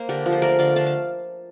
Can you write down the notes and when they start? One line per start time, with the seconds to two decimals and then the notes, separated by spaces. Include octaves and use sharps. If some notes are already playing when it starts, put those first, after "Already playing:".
Already playing: A#3 C5
0.09 D3 G4 A#4
0.26 F3
0.32 C5
0.42 A3 A#4 D5
0.59 D3 D5 F5
0.76 D3 F5 A5
0.86 A5